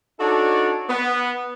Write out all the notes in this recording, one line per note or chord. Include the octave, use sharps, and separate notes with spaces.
D4 D#4 F#4 A4 C#5 D5
B3